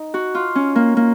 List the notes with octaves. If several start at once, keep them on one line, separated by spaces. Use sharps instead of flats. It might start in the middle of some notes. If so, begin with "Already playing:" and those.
Already playing: D#4
F#4
F4
C#4
A#3
A#3